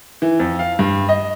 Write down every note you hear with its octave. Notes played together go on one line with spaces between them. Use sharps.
E3
F2
F5
G2
D#5